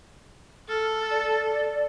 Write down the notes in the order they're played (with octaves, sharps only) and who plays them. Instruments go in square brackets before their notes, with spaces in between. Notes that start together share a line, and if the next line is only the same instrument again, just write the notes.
[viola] A4 [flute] F6
[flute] D5